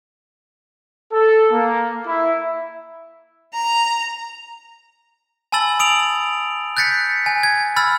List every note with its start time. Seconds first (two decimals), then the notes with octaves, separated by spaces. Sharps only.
1.13 A4
1.52 A#3
2.07 E4
3.53 A#5
5.52 G#5 A5 B5 E6 A6 F#7
5.80 D#6 D7 F7 F#7
6.77 F#6 G6 A6 B6 C#7
7.26 G#5
7.43 G#6
7.76 B5 E6 F6 A6